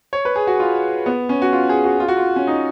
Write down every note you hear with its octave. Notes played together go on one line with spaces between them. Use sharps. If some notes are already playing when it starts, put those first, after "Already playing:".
C#5
B4
G#4
F#4
F4
B3
C#4
F#4
F4
G#4
F#4
F4
F#4
F4
C#4
D#4